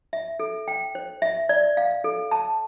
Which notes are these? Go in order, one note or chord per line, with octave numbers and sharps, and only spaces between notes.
E5
A4
G5
C5
E5
D5
F5
A4
A5